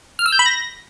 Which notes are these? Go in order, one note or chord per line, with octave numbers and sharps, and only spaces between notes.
F6
E6
G6
B5
A#6